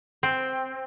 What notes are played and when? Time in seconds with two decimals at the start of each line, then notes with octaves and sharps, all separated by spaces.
0.23 C4